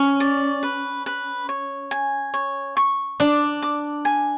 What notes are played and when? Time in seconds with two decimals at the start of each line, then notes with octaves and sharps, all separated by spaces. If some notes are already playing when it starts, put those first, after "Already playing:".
Already playing: C#4
0.20 D5
0.63 B4
1.06 B4
1.49 C#5
1.91 G#5
2.34 C#5
2.77 C#6
3.20 D4 D6
3.63 D6
4.05 G#5